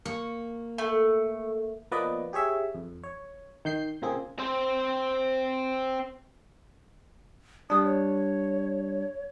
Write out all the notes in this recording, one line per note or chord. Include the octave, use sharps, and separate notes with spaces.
A#3 C#6
A3
F3 A#3 B3 B4 D5 D#5
G4 G#4 C#5 E5
F2
C#5
D#3 G6 C7
A#2 C#3 A#3 C4 G#4
C4 C5
G3 D4 D#6
C#5